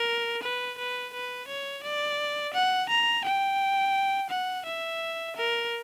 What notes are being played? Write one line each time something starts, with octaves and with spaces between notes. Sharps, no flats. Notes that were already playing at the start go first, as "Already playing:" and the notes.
Already playing: A#4
B4
B4
B4
C#5
D5
F#5
A#5
G5
F#5
E5
A#4